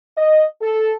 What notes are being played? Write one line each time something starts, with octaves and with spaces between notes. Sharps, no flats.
D#5
A4